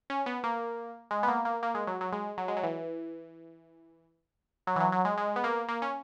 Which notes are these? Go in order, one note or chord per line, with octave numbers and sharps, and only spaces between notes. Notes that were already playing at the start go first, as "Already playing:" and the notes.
C#4
B3
A#3
G#3
B3
A#3
A#3
A#3
G#3
F#3
F#3
G#3
F#3
G#3
F#3
E3
F#3
E3
F#3
F#3
G#3
G#3
B3
A#3
A#3
C#4